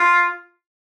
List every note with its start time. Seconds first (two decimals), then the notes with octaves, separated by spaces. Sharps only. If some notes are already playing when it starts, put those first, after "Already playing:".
Already playing: F4